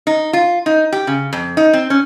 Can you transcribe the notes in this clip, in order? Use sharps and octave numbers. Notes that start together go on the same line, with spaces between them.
D#4
F4
D#4
G4
C#3
F2
D#4
C4
C#4